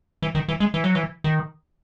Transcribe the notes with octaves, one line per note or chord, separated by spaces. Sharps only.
E3
D#3
E3
G#3
E3
F#3
E3
D#3